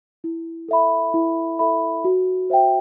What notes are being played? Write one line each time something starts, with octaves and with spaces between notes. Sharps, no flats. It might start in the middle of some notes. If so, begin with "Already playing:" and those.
E4
A4 E5 B5
E4
A4 E5 B5
F#4
C5 E5 G5